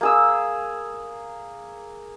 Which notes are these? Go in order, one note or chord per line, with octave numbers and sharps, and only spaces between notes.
A#3 G#4 E6